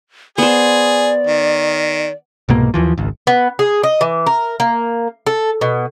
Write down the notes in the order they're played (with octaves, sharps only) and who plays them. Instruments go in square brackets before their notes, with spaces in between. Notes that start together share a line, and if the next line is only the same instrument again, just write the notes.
[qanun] B3 C5 [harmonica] G#4 [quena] D5
[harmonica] D#3
[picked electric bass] C2 G#2 B2 A#3
D#2 E3 F3
G#1 C#2
[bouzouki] B3
G#4
D#5
E3
A#4
A#3
A4
B2